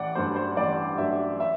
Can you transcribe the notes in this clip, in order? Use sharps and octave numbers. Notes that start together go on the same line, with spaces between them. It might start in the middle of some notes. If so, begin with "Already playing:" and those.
Already playing: A1 D5 F#5
G2 F#3 A3 C5
C5
A1 D5
G2 F#3 A3 E5
E5